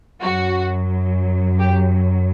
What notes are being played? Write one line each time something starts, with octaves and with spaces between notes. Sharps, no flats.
F#2 F#3 F#4
G4